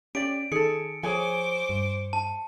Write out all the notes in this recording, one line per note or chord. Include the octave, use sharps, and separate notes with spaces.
C#4 G4 D5 D7
D#3 G#4 A4 C#7
F3 G#4 C5 C#5 G#5 D6
G2
A5